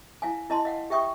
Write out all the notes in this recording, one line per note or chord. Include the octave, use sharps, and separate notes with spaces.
E4 F5 G#5
E4 D#5 A5 C6
D#5 F5 F#5
G4 E5 G5 C#6 D#6